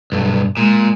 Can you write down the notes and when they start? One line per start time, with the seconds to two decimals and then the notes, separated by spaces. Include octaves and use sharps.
0.12 B1 G2
0.57 A#2 G#3